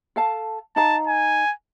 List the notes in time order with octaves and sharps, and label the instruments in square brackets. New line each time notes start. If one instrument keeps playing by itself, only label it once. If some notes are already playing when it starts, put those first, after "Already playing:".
[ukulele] A4 F5 A5
[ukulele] D#4 F5 A#5 [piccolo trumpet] A5
[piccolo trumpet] G#5